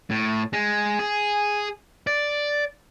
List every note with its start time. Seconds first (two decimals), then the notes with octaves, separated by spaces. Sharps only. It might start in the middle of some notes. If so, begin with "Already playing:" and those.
0.10 A2
0.53 G#3
0.99 G#4
2.07 D5